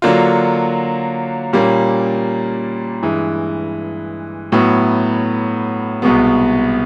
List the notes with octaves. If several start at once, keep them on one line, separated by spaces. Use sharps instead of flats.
D3 F#3 A#3 D4 F4
A#2 G3 A#3 C#4
G2 E3 G#3
A2 F#3 B3
C2 B2 G#3 B3